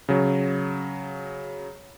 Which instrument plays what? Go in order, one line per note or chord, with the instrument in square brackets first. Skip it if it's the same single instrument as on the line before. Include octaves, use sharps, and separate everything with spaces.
[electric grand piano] C#3 F#3